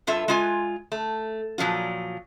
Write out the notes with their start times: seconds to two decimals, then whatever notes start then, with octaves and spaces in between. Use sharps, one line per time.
0.07 G2 F4 A4 E5
0.28 G#3 F4 G#5
0.92 A3
1.58 A#2 F3 F#3 F4